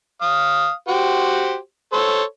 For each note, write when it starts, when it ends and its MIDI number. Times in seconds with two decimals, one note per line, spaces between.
0.22 0.71 77
0.22 0.71 87
0.88 1.57 66
0.88 1.57 67
0.88 1.57 72
1.93 2.22 69
1.93 2.22 72
1.93 2.22 73